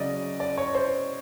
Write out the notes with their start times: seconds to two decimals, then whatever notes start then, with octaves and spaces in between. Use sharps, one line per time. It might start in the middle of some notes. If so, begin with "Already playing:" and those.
Already playing: C#3 F#3 D5 D#5
0.40 D5
0.58 C#5
0.75 C5